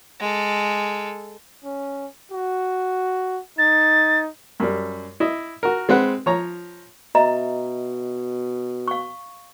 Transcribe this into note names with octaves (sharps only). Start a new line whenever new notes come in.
G#3 A4
C#4
F#4
D#4 A6
F#2 G3
E4 D#5
F#4 A#4
G#3 C4 B4 F#5
F3 C#5 A#5
B2 D#5 E5 A#5
F5 C#6